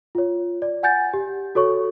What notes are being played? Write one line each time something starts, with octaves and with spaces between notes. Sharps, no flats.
F4 C#5
D5
F#5 G#5 G6 A6
G4
F#4 A4 C#5 C#6